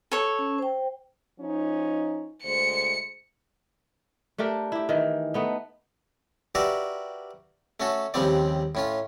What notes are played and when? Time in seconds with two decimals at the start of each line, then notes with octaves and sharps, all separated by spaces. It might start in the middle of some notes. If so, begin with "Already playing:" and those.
0.12 A4 C#5
0.39 C#4
0.59 C5 G5
1.39 F3 C#4 D#4
2.44 D2 G#3 C5 C#7
4.38 A3 D4 G4 A#4
4.72 E4 G4
4.89 D#3 E3
5.34 A3 B3 D#4
6.55 F#4 G4 A#4 B4 D5 E5
7.80 A3 C#4 F#4 A4
8.14 D#2 C#3 F3 G3 C4 D5
8.75 A2 C#4 F4